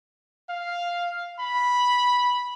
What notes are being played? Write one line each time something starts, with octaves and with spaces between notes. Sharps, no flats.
F5
B5